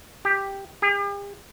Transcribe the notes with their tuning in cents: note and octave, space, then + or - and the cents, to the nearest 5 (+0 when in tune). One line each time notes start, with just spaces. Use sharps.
G4 +5
G4 +45